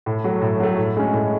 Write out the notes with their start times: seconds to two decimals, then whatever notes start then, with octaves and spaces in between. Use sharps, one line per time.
0.06 A2
0.24 F#3 A3
0.42 A2
0.60 F#3 A3
0.78 A2
0.97 G#3 C#4
1.13 A2